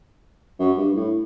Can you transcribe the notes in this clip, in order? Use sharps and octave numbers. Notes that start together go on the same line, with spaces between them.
F#2
G2
A2